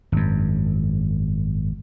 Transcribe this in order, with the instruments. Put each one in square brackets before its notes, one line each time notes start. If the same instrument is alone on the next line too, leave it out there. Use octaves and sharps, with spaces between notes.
[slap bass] G#1 F#2